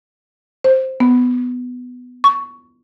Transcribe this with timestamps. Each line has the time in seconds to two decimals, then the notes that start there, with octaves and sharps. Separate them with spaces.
0.64 C5
1.00 B3
2.24 C#6